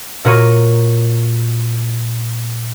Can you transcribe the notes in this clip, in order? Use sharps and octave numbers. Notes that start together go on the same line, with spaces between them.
A#2 F#4 A#4 C#5 C#6 D#7